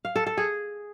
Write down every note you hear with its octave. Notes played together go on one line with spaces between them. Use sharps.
F5
A4
A4
G#4